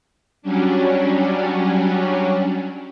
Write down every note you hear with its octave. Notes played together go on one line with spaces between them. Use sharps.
F#3 G3 C#4 D4